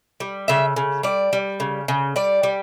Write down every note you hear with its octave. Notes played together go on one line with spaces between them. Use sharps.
G3
C#3 E5
C#3
G3 D5
G3
C#3
C#3
G3 D5
G3